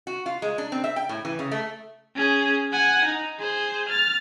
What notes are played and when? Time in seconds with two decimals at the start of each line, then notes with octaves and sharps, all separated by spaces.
0.07 F#4
0.26 F4
0.42 G#3
0.58 D4
0.72 C4
0.84 E5
0.96 G5
1.09 A2
1.25 E3
1.39 C#3
1.51 A3
2.16 C#4 G#4
2.72 F#5 G#5
3.05 D#4
3.39 G#4 C5
3.89 F6 A6